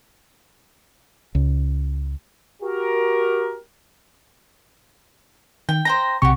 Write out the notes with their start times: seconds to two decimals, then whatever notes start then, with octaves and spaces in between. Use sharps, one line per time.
1.35 C#2
2.62 F#4 G4 A#4
5.69 D#3 G5
5.85 C5 G5 A#5 A#6
6.22 B1 C3 F#4 G4 C#6